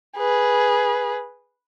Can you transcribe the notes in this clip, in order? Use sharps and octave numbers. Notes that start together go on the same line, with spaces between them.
G#4 B4